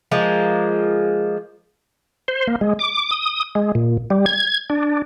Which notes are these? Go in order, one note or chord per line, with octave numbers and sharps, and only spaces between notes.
F3 G#3 A#3
C5
A#3
G#3
D6
D#6
G#3
A#2
G3
G#6
D4